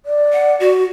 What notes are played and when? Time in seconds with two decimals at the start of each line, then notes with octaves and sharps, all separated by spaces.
0.06 D5
0.33 F#5
0.60 F#4